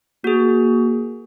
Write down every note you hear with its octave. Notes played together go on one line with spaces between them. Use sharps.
A#3 F#4 G#4